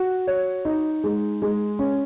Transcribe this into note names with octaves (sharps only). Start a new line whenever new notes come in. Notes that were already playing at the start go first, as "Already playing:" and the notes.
Already playing: F#4
C#5
D#4
G#3
G#3
C#4